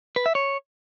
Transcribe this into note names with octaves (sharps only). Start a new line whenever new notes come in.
B4
E5
C#5